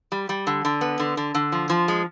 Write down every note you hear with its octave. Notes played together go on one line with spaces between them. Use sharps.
G3
G3
D3
D3
B3
D3
D3
D3
F3
F3
G#3